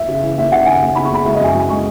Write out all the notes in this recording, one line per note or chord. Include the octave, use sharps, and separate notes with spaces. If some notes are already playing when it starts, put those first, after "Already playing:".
Already playing: E5
C#3
E3
D#2 E5
C#3 F#5
D#2 G#5
D#2
C#3 B5
C#6
C#3 B5
G#3 E5
D#5
F#2 G#5
F#2 G#5
G#3 C#6